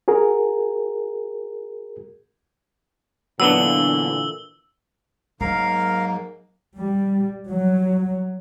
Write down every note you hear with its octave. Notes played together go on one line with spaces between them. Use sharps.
F#4 G#4 A#4
A#2 D3 E3 F#3 B3 D4 E6 G7
G#2 F#3 A#3 A#4 F5
G3
F#3